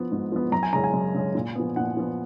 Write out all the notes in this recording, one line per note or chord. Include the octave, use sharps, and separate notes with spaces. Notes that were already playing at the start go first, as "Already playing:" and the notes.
Already playing: F3 B3
G#2
F3 B3
F#2 A#5
G#5
C#3 G#3 C#4 A#5
G#5
F#2
C#3 G#3 C#4
A#2
F3 B3
A#2 F#5
F3 B3